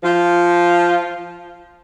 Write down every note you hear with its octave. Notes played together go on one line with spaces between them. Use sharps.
F3 F4